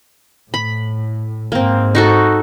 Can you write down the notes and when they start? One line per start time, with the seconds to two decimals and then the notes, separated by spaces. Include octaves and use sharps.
0.54 A2 B5
1.52 G#2 A#3 C4
1.95 D#4 F#4 A4